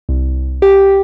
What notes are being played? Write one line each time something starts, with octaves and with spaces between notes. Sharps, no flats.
C2
G4